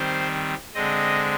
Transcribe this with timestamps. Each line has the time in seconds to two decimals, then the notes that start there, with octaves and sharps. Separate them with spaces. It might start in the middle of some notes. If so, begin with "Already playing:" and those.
Already playing: D#3 G3 C4 C5
0.74 D3 G#3 C4 D#5